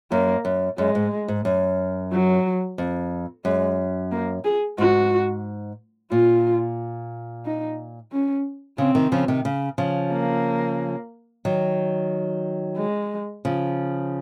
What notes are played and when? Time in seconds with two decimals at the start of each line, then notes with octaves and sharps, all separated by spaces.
0.11 F#2 A#3
0.45 F#2
0.78 F#2 G#3
0.95 G#2
1.28 G#2
1.45 F#2
2.12 F#3
2.78 F2
3.45 F#2 G#3
4.11 A#3
4.44 G#4
4.78 G#2 F#4
6.11 A#2 F4
7.45 D#4
8.12 C#4
8.78 C#3 C4
8.95 C3 D#3
9.12 C#3 F3
9.28 C3 D#3
9.45 C#3
9.78 C#3 F3
10.12 A#3
11.45 D#3 F#3
12.78 G#3
13.45 C#3 F3